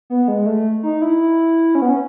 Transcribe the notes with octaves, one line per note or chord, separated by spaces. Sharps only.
B3
G#3
A3
D#4
E4
C#4
B3
C#4